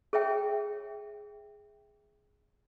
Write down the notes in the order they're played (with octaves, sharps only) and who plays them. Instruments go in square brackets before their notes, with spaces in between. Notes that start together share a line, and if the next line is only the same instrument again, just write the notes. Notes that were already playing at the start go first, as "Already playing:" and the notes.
[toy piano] G#4 C#5 E5 G5